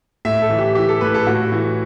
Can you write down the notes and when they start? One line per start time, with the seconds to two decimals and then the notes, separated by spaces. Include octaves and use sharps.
0.25 A2 E5
0.42 A4
0.50 E3
0.59 G4
0.75 E3 G4
0.89 A4
1.01 A2 B4
1.14 A4
1.27 A2 F#4
1.52 E3